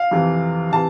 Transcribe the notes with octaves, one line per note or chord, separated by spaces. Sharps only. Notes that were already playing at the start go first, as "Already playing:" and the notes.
Already playing: F5
F2 C3 E3
C3 E3 A5